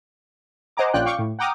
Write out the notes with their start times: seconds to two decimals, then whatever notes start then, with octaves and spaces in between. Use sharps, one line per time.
0.77 C5 D#5 F#5 G#5 A#5 D6
0.93 A#1 C#4 F4 D5 G5 F#6
1.06 F5 G5 C#6 D6
1.19 A2
1.39 F#5 G5 A#5 D6 D#6 F6